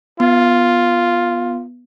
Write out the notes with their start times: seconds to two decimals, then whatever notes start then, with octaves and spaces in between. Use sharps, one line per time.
0.20 B3 F4